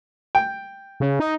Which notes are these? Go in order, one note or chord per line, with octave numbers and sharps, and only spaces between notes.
G5
C#3
D#4